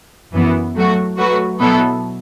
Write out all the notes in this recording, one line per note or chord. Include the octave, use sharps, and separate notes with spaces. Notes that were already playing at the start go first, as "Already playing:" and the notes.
F#2 E3 B3
F#3 A3 F#4
F#3 A3 F#4 B4
B2 F#3 B3 E4 A4